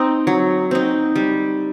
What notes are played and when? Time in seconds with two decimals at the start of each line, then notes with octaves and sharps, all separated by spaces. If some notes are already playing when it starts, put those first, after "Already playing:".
Already playing: C4 D#4
0.27 F#3
0.71 C4 D#4
1.16 G3